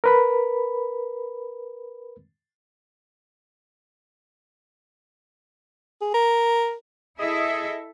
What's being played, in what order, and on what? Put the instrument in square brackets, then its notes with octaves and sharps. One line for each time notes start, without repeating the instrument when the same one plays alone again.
[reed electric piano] A#4 B4 B5
[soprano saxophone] G#4
A#4
[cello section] E4 A4 E5 [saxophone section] G#4 D#5